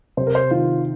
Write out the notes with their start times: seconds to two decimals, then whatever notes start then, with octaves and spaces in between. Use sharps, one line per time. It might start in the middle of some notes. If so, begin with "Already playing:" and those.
0.17 C3 C5
0.27 A#4
0.35 C5
0.51 D#3 F4